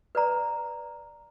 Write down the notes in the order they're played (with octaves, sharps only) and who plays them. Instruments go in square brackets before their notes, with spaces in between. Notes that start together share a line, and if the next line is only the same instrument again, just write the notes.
[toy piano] B4 D5 A#5